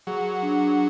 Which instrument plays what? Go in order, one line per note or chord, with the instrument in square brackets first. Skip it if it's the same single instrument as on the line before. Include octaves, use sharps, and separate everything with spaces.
[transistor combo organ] F#3 [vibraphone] G#4
[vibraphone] D4